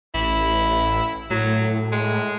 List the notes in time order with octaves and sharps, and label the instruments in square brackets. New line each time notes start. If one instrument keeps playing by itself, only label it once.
[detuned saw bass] A1 [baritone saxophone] E4
[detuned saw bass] A2 [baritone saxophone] F#3
[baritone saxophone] G#3